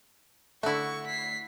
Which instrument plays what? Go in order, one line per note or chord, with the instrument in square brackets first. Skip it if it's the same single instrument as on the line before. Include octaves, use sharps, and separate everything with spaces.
[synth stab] D3 A3 [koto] E4 F#4 [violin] C#6
[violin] B6 C7